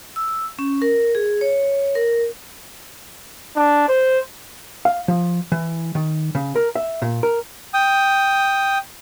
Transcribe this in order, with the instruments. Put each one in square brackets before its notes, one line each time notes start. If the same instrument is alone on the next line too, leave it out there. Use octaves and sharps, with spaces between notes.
[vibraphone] E6
C#4
A#4
G#4
C#5
A#4
[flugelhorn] D4
C5
[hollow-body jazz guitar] F5
F3
E3
D#3
C#3
A#4
E5
A#2
A#4
[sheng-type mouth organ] G5 D#6